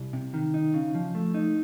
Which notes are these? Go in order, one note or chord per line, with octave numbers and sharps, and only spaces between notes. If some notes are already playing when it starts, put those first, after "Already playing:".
Already playing: C2
C3
D#3
D#4
C#3
F3
A3
D#4